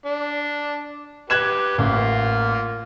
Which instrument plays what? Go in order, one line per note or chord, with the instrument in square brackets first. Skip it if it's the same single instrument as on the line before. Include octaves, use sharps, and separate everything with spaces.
[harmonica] D4
[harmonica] G4 B4 [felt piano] F#6 G#6 E7
[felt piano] A1 [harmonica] A#3 F4